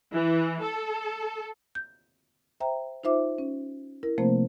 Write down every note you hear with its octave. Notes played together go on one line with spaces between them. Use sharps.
E3
A4
G6
C5 E5 G5 A#5
D#4 F4 C5 E5 D6
C#4
E4 A#4
C3 F3 A3 A#3 C4 C5